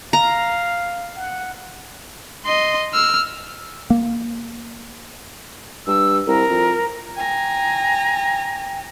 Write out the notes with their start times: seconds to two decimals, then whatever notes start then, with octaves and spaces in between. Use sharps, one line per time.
0.13 F5 A#5
1.16 F#5
2.45 D#5 C6
2.94 E6 F6
3.90 A#3
5.87 G2 E6
6.27 C2 A#4
6.50 F2
7.16 G5 G#5 A#5